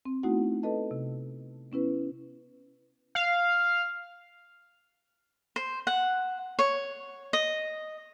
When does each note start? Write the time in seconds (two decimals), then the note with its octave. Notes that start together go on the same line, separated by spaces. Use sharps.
0.05 C4
0.23 A3 B3 D#4 E4 F#4 F#5
0.63 A4 B4 D#5 A5
0.91 C3
1.72 B3 C#4 E4 B4
3.15 F5
5.56 C5
5.87 F#5
6.59 C#5
7.33 D#5